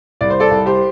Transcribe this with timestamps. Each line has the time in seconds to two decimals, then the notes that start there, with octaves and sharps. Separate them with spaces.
0.21 C2 D5
0.30 C5
0.40 A4 D5
0.51 C2
0.66 G4 C5